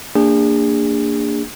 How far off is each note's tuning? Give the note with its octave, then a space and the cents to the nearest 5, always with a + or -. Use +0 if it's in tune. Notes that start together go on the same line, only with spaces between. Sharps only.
A#3 -25 D4 +0 G#4 -35